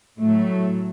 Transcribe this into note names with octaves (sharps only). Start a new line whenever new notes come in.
A2 F#3 A3